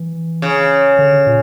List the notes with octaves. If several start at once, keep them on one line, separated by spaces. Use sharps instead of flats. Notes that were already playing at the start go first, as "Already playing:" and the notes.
Already playing: E3
C#3
D3
A#2